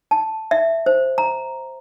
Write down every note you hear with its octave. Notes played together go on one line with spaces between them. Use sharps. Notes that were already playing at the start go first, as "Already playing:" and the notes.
A5
E5
C5
A#5